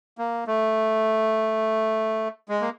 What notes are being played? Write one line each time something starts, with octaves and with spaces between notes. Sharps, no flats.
A#3
A3
G#3
A#3